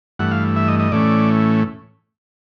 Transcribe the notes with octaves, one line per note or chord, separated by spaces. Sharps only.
G2 E3 A3 F#5
F5
E5
D#5
D#5
A2 E3 A3 C#4 D5